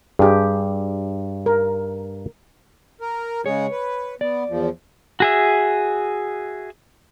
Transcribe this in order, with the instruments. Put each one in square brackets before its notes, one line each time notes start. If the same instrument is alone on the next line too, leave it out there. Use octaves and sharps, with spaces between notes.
[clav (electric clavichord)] G2 [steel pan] G4 G#4
[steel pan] A#4
[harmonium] A#4
[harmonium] C#3 G#3 G#4 [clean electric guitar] C#5
[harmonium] B4
[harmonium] B3 [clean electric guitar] D5
[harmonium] E2 F3
[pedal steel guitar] F#4 G#4 E5